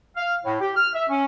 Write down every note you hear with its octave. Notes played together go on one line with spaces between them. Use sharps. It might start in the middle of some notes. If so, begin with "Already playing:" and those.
F5
A2
G4
F6
E5
C#4